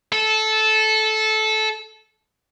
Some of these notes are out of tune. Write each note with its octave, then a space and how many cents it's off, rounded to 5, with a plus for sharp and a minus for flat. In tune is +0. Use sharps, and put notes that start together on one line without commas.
A4 -15